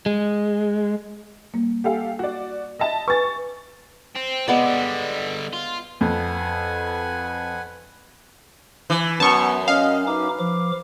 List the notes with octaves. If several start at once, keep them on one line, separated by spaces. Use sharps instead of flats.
G#3
G3 A#3
G4 A4 F5 F#5 G#5
F#4 D5
D#5 E5 A5
B4 G#5 C#6 A6
C4
C3 G#3 B3 D5
D3 G3
F4
F2 B4 F#5 G#5
E3
F#2 B3 A5 C#6
C#4 D#5 F5
D#4 B4 D6
F3 D6